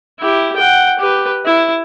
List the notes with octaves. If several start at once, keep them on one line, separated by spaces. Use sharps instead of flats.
E4 G4
F#5 G5
G4 B4
E4